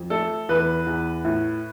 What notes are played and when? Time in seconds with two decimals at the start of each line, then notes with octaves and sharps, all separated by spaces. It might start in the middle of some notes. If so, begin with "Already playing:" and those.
Already playing: F2
0.10 A3 A4
0.49 E2 B4
0.87 E2
1.24 A2